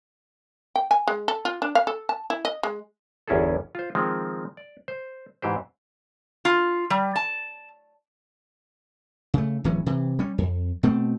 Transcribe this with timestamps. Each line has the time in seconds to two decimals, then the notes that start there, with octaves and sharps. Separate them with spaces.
0.76 G5
0.91 G#5
1.08 G#3
1.28 A4
1.45 F4
1.62 D4
1.75 F5
1.87 A4
2.09 A5
2.30 E4
2.45 D#5
2.63 G#3
3.28 G1 E2 C#4 E4 G#4 A4
3.75 F4 C5
3.95 D#3 F3 G#3 C4
4.57 D5
4.88 C5
5.42 G#2 E3 G4 C5
6.45 F4
6.90 G3
7.16 A5
9.34 C#3 A3
9.64 D1 E3 F#3 C#4
9.86 C3 E3
10.19 G3 C#4
10.38 F2
10.83 B2 A3 C4